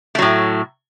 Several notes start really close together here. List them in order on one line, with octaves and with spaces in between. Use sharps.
A3 F#3 A2